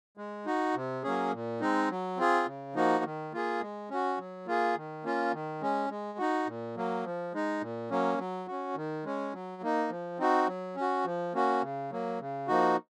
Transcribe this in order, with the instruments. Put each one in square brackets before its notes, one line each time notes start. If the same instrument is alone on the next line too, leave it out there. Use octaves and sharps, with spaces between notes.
[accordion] G#3
D#4 F#4
C3
F#3 A#3 C#4 G#4
A#2
G#3 C4 D#4
F#3
C4 F4 G#4
C#3
F3 A#3 D#4 F#4
D#3
A#3 F4 G#4
G#3
C#4 F#4
F#3
A#3 F4 G#4
D#3
A#3 C#4 F4
D#3
G#3 C#4
G#3
D#4 F#4
A#2
F#3 A#3
F3
G#3 D#4
A#2
F#3 A#3 C#4
F#3
C#4 F#4
D#3
G#3 C#4
F#3
A#3 D#4
F3
C4 D#4 F#4
F#3
C#4
F#4
F3
A#3 C#4 F#4
C#3
F#3 A#3
C#3
F3 A#3 D#4 F#4